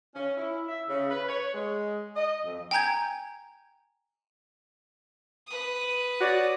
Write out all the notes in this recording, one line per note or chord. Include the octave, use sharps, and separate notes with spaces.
C#4
E4
E5
C#3
B4
C#5
G#3
D#5
F2
G5 G#5 A#5 G6 G#6
B4 D#6
F#4 C#5 D5